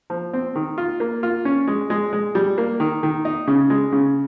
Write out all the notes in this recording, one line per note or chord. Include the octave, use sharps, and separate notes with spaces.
F3
C4
D#3
F4
A#3
F4
C#4
G#3
G#3
G#3
G3
A#3
D#3
D#3
D#4
C#3
G#3
C#3